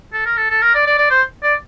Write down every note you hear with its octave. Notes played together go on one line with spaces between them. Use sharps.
A4
A#4
A4
A4
A#4
D5
D5
D5
C5
D5